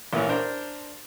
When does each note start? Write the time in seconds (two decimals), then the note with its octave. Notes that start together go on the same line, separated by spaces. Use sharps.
0.13 A1 A#2 E3 C#5
0.29 D4 A#4 C5